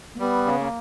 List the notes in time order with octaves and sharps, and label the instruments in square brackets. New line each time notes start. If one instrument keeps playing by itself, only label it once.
[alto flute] A#3
[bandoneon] G3 [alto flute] B3
[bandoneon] C#3
[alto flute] A#3